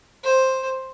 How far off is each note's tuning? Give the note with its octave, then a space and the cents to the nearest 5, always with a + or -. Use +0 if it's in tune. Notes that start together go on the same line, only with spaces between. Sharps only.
C5 +5